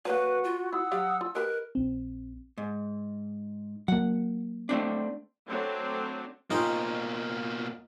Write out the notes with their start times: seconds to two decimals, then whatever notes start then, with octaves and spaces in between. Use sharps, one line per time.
0.05 F#3 A#3 F#4 B4
0.44 F4
0.73 E4 F#4 F#5 D#6 E6
0.92 F#3 G4 D5 F5
1.21 F4 E6
1.35 G4 A#4 B4 D#5 F#6
1.75 A#1 C4
2.58 G#2
3.88 F#3 A#3 F#5
4.69 A3 C4 D4
5.48 F#3 A3 C4 D4
6.50 B2 A#3 C4 C#4 D#4 F4 C5